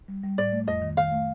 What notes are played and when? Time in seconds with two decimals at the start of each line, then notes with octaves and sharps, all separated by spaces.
0.08 G3
0.23 G3
0.38 A2 D5
0.52 A3
0.67 F2 D#5
0.82 D#3
0.97 D#3 F5
1.12 A3